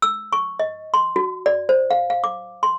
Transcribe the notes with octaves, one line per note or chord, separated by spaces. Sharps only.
E6
C#6
D#5
C6
F#4
D5
C5
F5
F5
D6
C6